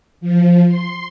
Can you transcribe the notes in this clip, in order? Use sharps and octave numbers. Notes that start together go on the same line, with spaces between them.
F3
C6